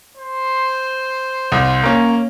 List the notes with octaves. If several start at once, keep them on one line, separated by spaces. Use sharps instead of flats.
C5
C2
A#3 C#4